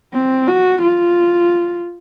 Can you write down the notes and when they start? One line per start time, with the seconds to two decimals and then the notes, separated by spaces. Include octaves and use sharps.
0.13 C4
0.48 F#4
0.82 F4